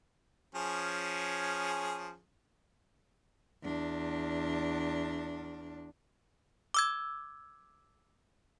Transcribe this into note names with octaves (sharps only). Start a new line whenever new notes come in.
F3 C#4 G#4
E2 D4
D6 E6 G#6